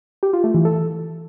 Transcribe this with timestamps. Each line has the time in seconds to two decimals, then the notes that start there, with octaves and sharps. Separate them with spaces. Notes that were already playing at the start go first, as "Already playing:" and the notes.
0.23 G4
0.33 F4
0.44 A3
0.54 E3
0.65 A4